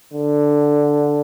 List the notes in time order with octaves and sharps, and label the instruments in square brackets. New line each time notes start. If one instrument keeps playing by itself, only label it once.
[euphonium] D3